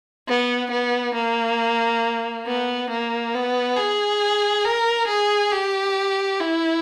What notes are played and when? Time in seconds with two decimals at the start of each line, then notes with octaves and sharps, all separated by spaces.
0.28 B3
0.72 B3
1.15 A#3
2.46 B3
2.91 A#3
3.34 B3
3.77 G#4
4.65 A#4
5.08 G#4
5.51 G4
6.39 E4